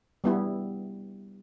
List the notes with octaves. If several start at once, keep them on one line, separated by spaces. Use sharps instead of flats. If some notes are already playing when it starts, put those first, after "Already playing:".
G3 B3 E4